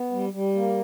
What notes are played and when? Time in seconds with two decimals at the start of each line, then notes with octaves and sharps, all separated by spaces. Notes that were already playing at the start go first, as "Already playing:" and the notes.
Already playing: B3
0.12 G3
0.33 G3
0.55 A#3